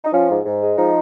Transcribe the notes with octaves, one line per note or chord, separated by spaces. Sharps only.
D#4
F3 C#4 F4
G#2
G#2
G#3
F3 D#4